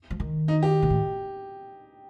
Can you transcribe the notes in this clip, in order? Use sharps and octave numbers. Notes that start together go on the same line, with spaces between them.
F3
D#3
D#4
G4
A#2
A2